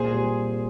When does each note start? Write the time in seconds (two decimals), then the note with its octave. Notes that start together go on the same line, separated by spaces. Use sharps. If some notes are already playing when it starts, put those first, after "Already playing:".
Already playing: A#2 G#4 C5
0.13 G3 C4